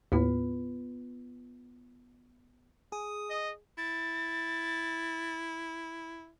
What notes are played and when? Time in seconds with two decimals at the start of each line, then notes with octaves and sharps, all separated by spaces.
0.12 D#2 A2 B3 F4 B4
2.92 G#4 D#6
3.30 D#5
3.78 E4 A6